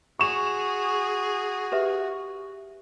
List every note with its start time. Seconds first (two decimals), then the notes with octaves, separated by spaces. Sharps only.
0.19 F#4 G#4 C#6 E7
1.72 G4 B4 E5